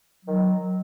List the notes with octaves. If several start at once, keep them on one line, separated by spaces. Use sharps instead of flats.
D#3 F#3